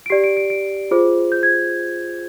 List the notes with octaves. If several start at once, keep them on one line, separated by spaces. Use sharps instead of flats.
D7
G4 D5 C7
D7
D7
D7
F4 G#4 C5
G6
G#6